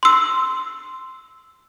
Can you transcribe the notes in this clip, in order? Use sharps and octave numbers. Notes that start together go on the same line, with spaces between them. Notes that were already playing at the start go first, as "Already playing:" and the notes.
C6 E6